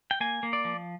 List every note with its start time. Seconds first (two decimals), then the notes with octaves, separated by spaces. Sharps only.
0.11 G5
0.20 A#3 G#5
0.43 A#3
0.53 D5
0.65 F3